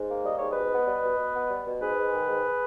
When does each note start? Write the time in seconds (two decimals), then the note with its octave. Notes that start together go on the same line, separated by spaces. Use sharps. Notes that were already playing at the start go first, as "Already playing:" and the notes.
Already playing: G#2
0.09 A#3
0.24 G3 D#5
0.38 G#2 C#5
0.51 B4 D#5
0.56 B2
0.71 B3
0.87 G3
1.03 B2
1.18 B2
1.35 B3
1.50 G3
1.66 B2
1.81 G#2 G#4 B4
1.97 G#3
2.13 D#3
2.29 G#2